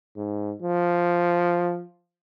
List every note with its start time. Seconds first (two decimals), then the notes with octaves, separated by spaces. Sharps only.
0.16 G#2
0.62 F3